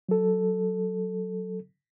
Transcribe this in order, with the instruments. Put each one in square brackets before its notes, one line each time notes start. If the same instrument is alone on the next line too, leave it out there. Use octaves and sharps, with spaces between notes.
[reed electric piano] F#3 A4